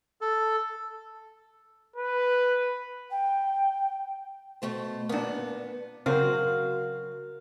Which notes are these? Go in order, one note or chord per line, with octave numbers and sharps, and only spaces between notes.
A4
B4
G5
B2 A3 C5
A#2 A#3 B3 D4
C#3 F#3 C4 F#4 A#4 C5 F5 F6